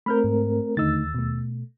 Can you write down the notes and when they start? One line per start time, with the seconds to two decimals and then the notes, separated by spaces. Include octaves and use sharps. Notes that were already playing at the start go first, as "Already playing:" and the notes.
0.06 A3 C4 A#4 B5 F6 G6
0.24 G#2
0.77 D#2 D3 A3 D#4 E6 A6
1.15 B2 A3